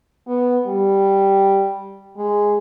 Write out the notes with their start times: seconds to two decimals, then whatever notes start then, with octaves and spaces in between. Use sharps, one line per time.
0.27 B3
0.67 G3
2.17 G#3